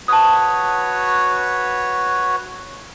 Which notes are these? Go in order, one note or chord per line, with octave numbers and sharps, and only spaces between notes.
F#4 B4 C#5 A5 D#6